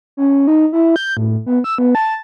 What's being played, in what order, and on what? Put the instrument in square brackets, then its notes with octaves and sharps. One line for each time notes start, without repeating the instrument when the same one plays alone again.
[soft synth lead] C#4
D#4
E4
G6
A2
B3
E6
B3
A5